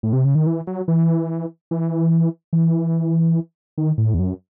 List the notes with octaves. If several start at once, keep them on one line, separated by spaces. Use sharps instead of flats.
A2
C3
C#3
D#3
E3
F#3
E3
E3
E3
D#3
A2
E2
F#2